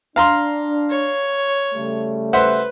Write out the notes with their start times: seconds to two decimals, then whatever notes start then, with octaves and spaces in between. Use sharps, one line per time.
0.16 D4 F5 A#5 C6
0.89 C#5
1.74 C#3 G3 A3
2.33 B4 C5 E5 F#5